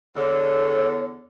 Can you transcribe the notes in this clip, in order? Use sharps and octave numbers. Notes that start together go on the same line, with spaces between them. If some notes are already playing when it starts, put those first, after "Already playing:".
E2 D3 C#5